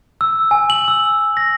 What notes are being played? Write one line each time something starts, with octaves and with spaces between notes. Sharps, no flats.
E6
G#5
F#7
E6
A#6